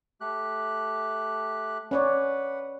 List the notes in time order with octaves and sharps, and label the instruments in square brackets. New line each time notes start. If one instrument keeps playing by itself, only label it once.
[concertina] A3 G4 F#6
[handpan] C#4 C#5 D5 [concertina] B4 F#5